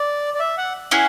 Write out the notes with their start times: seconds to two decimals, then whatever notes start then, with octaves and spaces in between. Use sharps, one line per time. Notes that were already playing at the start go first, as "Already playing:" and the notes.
Already playing: D5
0.34 D5
0.40 E5
0.57 F#5
0.91 C#4 E4 G#4 F#5